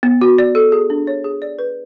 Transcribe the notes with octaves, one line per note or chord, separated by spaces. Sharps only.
B3
F#4
D5
A4
G#4
D4
C#5
G#4
D5
B4